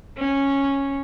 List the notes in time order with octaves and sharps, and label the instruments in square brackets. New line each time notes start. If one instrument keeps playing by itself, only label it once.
[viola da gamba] C#4